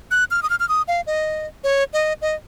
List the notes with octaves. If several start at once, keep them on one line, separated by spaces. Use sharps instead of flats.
F#6
F6
D#6
F6
F6
D#6
F5
D#5
C#5
D#5
D#5